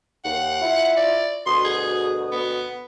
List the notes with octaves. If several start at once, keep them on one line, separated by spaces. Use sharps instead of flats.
D#2 F#5
E4 F4 E5
D5
D2 B2 C6 D#6
G#4
B3